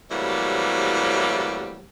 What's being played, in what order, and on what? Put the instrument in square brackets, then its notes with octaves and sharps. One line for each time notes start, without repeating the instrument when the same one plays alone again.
[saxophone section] A2 C3 E3 F#3 G3 A#3